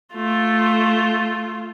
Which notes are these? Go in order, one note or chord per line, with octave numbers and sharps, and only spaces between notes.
A3 F4